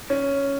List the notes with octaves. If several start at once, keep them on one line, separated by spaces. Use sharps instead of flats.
C#4